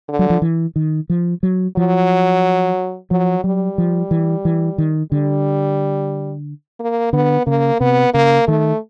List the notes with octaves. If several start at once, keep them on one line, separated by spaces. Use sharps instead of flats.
D3
F#3
F3
E3
D#3
F3
F#3
F3 F#3
F3 F#3
F#3 G3
F3
E3
E3
D#3
D3 G3
A#3
D3 B3
C#3 A#3
C3 B3
C#3 A#3
D#3 A3